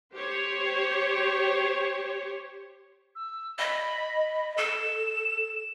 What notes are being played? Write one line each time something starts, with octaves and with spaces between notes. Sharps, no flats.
G4 C5 C#5
E6
D#5 B5
A4 E7